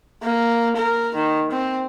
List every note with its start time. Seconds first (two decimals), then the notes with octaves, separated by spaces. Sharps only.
0.22 A#3
0.76 A#4
1.15 D#3
1.51 C4